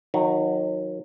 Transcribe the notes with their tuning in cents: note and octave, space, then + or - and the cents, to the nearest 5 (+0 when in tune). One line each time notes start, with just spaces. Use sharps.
D#3 +0 F#3 -30